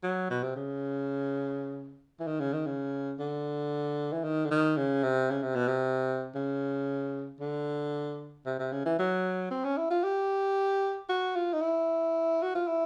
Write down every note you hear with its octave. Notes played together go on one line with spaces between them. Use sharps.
F#3
B2
C3
C#3
E3
D#3
C#3
D#3
C#3
D3
E3
D#3
D3
D#3
C#3
C3
C#3
C3
B2
C3
C#3
D3
C3
C3
C#3
E3
F#3
C4
C#4
E4
F4
G4
F#4
F4
D#4
E4
F#4
F4
E4